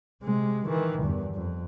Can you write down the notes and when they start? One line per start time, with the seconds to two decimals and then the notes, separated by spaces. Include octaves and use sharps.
0.23 C3 G#3
0.66 D#3 E3
1.03 E2 G2
1.34 F2